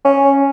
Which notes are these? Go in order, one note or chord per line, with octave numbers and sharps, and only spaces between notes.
C#4